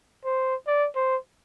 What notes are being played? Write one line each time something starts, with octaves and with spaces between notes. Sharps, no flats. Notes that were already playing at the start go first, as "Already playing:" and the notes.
C5
D5
C5